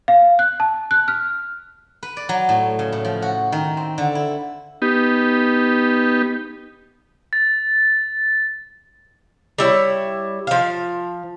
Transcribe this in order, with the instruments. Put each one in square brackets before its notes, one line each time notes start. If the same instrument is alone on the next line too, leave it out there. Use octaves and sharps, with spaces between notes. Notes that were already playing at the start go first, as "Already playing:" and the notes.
[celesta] F5
F#6
A5
F#6
F6
[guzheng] B4
D5
F#3
A2
C#3
A2
F3
F#4
D#3
C4
D3
E4
[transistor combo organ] B3 D#4 G4
[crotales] A6
[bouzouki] G3 E4 C#5
F3 F5